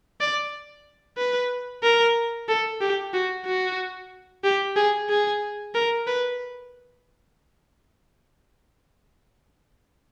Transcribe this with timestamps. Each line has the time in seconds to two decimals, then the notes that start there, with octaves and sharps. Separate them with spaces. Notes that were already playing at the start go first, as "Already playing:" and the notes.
0.20 D5
1.18 B4
1.83 A#4
2.49 A4
2.81 G4
3.14 F#4
3.46 F#4
4.44 G4
4.76 G#4
5.10 G#4
5.75 A#4
6.07 B4